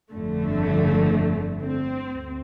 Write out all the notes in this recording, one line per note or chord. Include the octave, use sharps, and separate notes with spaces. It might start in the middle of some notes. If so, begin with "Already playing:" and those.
G1 F2 D3 A3
C4
D2